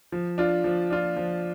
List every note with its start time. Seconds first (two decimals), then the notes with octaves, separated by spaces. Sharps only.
0.12 F3
0.38 D4 F4
0.64 F3
0.90 D4 F4
1.17 F3